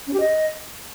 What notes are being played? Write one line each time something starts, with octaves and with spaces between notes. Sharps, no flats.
C#4
G4
D#5